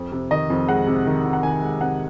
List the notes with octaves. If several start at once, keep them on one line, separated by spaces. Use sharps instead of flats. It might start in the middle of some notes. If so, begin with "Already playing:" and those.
Already playing: F2
C3
D#3 D#5
F2
G#3 F#5
C3
D#3
F2
F#5
D#3 G#5
G#3
C3 F#5